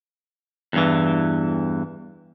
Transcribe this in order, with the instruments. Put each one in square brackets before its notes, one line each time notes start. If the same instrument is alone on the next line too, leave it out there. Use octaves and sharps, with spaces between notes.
[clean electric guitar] E2 G2 E3